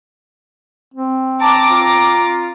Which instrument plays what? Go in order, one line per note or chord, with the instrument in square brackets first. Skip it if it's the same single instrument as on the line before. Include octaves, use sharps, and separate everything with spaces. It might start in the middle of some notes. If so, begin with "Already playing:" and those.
[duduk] C4
[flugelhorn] A5 [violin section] A#5 D6
[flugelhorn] F4